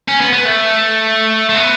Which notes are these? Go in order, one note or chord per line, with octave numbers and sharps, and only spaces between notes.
C#4
B3
B3
A3
A3
B3